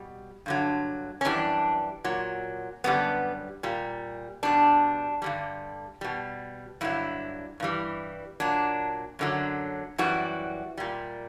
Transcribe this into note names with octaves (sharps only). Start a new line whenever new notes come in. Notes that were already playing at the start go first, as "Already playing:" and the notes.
Already playing: B2 G3
G2 D3 F#3
C#4
F#2 E3 G3 D4
A#2 F#3
F#2 D3 G3 B3
A#2 G3
B2 G3 D4
G2 D3 G3
B2 G3
G2 D3 F#3 E4
G2 E3 G3
A#2 F#3 D4
F#2 D3 F#3
F#2 E3 G3 F#4
A#2 G3